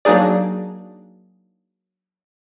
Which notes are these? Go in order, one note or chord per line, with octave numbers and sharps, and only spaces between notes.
F#3 A#3 D4 D#4 G#4 D5